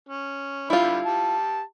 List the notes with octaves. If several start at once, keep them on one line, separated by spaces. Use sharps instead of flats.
C#4
D3 G3 E4 F4 B5
G4 A5